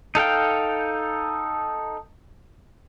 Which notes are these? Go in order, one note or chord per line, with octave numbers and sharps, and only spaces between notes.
D#4 A4 F5 G5